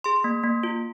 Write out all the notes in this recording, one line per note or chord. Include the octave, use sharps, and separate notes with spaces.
G#4 C6
A#3
A#3
F4